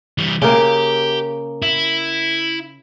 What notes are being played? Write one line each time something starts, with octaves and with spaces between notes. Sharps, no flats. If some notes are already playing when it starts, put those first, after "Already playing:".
E3 G3
C#3 A#3 G4
E4